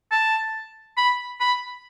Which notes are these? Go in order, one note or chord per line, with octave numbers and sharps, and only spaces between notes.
A5
B5
B5